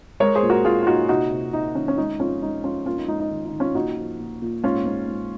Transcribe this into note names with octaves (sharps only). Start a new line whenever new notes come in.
G#3 A#4 C#5
G#4 C5
A#2
F#4 A#4
A#2 F4 G#4
F4
A#2 D#4 F#4
C3 D#4 F#4
C3
C3 D#4
D#3 C#4
C#4
G#3 D#4
F2 C#4 F4
G#3 D#4
F2 C#4 F4
A#3 C#4 F4
D#4
G#2 D#4
D#4
D#3
D#4
D#3
C#4 F4
A#2 D#4 F#4
F3
A#2
A#2
G#2 C#4 F4
G#2
G#2